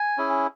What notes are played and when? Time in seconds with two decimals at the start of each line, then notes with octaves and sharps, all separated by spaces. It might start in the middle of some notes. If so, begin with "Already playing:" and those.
Already playing: G#5
0.17 C#4 E4 G#4